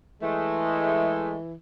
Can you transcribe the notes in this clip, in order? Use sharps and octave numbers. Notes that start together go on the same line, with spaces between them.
E3 G#3 A3